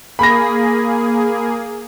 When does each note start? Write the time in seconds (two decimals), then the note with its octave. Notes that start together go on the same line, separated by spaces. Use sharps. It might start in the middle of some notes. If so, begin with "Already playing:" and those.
0.19 A#3 G#4 B5 A#6